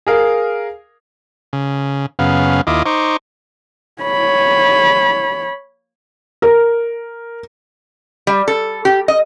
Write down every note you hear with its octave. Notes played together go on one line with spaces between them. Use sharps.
G#4 A#4 F5
C#3
F#2 C#3 B3 F5
D#2 E4 F4 D#5 D6
D#4 C5 C#6 D6
C#5 B5
A#4
G3
A4
G4
D#5